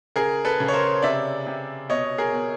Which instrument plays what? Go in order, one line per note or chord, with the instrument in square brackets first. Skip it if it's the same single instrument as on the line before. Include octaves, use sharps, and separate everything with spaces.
[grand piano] C#3 G#4 A#4
A4 B4
C#3
C#5
A#4 C5
C3 D5 E5
C3
B2 C#5 D#5
G#4 A#4
B2